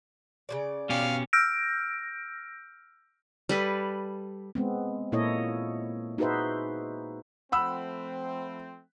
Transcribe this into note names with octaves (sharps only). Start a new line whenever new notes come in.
C#3 F3 D5
B2 C#4 G4 F5
E6 F6 G6 A#6 D7
G3 A4 B4 G#5
G#3 B3 C4
A#2 A#3 E4 A4 C#5 D#5
D#4 F#4 G#4 B4 C5 E5
F3 A3 C4 F#5 B5 E6